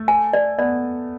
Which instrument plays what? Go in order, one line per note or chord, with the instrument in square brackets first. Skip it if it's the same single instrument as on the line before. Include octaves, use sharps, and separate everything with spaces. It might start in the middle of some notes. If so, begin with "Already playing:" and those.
Already playing: [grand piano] A3
[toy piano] G#5
D5
[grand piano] B3 [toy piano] D5